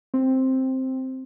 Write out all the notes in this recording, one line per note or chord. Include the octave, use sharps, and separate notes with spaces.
C4